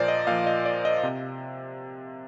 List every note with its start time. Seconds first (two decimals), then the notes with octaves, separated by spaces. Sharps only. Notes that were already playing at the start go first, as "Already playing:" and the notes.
Already playing: A#2 F3 A#4 C5 D5
0.08 D#5
0.27 A#2 F3 F5
0.46 D#5
0.66 D5
0.85 D#5
1.03 C3